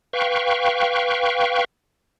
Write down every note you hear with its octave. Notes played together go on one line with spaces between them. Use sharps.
B4 F5 G5 C#6